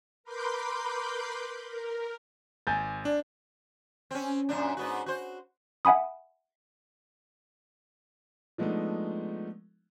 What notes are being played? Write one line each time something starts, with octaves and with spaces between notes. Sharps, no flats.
A#4 B4 B5 C6 D6 G6
A#4
G#1 G#5 G6 A6
D4 D5
C4 C#4
F#2 A#2 D4
G#2 B3 F#4
F#4 C5
E5 F#5 G#5 B5 D#6
F3 G#3 A3 B3 D4 D#4